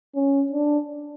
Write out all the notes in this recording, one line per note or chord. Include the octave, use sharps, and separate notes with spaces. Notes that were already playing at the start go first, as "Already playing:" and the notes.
C#4
D4